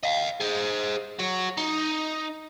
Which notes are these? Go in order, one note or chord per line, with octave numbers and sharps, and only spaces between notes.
D#5 F5
G#4 C5
F#4 C#5
D#4